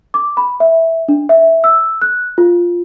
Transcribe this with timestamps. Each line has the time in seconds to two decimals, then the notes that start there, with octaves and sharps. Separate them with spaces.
0.14 D6
0.37 B5
0.60 E5
1.08 D4
1.29 E5
1.64 E6
2.02 F#6
2.38 F4